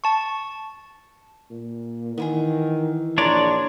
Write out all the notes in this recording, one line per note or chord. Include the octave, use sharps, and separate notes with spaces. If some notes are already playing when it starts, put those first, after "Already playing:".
A5 C#6
A#2
D#3 E3 B3 E4 G#4
A#1 D4 A#4 C#5 D5 A#5 C6